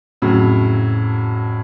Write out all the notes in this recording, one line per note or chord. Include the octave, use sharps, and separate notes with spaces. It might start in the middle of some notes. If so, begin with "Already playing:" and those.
F2 A2 C#3 F#3